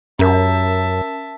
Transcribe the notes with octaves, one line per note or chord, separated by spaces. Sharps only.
F#2 C#4 A#4 E5 A5